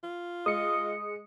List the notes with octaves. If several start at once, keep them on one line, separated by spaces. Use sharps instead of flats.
F4
G#3 D#5 D#6 C#7